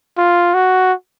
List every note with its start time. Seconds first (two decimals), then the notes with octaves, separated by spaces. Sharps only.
0.18 F4
0.54 F#4